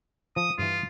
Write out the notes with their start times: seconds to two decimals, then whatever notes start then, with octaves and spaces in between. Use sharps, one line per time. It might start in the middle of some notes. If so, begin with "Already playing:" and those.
0.36 F3 D#6
0.58 G2 E3 F4